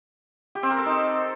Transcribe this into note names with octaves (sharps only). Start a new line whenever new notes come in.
G4
C4
A#4
A4
D#4